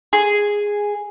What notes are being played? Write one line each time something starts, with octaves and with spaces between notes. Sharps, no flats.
G#4